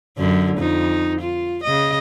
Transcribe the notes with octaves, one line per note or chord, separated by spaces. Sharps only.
F#2 D3 C#4
F2 D#4
F4
C#3 D#5